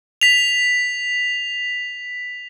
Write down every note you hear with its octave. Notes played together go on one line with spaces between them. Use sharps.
B6 F7